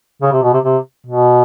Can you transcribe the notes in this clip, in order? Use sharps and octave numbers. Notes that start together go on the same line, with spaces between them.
C#3
C3
B2
C3
C3
B2